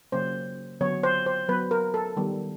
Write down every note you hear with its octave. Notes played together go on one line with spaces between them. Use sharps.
C#3 F#3 A#3 C#4 C5
D3 F#3 B3 C#5
C5
C5
F#3 B3 B4
A#4
A4
D#3 G3 B3